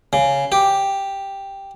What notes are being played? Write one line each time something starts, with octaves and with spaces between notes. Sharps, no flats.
C#3
G4